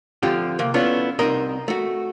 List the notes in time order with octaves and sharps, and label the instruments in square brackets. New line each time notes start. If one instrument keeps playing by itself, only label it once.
[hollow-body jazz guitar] D3 F3 C4 F4 G4
C3 A#3
A3 B3 C#4 D4 E4 F4
C2 C4 D#4 A#4 D#5
A3 F#4